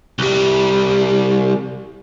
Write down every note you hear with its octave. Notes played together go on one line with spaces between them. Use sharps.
C2 G3